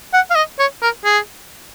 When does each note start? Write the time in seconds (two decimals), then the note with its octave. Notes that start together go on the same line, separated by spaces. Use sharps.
0.13 F#5
0.30 F5
0.35 D#5
0.59 C#5
0.82 A#4
1.05 G#4